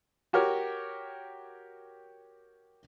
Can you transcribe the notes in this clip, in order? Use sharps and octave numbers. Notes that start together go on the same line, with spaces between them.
F#4 G4 A#4 C#5